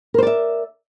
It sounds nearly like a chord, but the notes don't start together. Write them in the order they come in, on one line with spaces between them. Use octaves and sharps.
A#4 C5 D5 E5